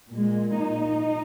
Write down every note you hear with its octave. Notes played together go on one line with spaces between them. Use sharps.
A#2 G#3
D#4